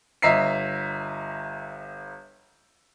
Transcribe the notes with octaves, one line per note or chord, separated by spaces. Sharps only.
G1 D#5 E5 A#5 B6 C7